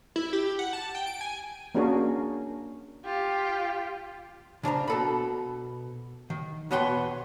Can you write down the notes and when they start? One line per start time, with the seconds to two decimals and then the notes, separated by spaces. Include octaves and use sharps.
0.16 E4
0.33 G4
0.59 F#5
0.73 A5
0.95 G5
1.06 D7
1.21 G#5
1.75 A#3 C#4 D4 F#4 G#4 A#4
3.04 F4 G4
4.63 C#3 D4 C5 A#5
4.88 B2 A4 B5
6.30 D#3
6.71 E2 B2 B3 C#5 G5 C6